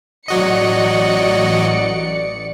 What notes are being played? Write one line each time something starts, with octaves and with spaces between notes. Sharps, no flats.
A1 F#3 F#4 D5 D#5 C#7